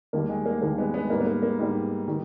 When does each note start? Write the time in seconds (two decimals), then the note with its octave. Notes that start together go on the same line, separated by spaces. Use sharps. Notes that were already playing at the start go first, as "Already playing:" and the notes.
0.13 D#2 D#3 G3 A#3
0.29 G#3
0.46 A#3
0.62 D#2 D#3 G3 A#3
0.78 G#3 B3
0.94 G#3 B3
1.10 G#2 G3 A#3
1.20 B3
1.27 A#3
1.42 A#3
1.59 G#2 G3
2.08 D#3 G3